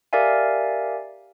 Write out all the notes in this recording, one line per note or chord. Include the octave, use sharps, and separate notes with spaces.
G4 A#4 D5 E5 F5 G#5